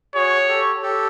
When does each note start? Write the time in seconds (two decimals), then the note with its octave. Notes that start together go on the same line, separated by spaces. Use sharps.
0.14 F#4 G#4 C#5
0.48 G4 A4
0.82 G4 A4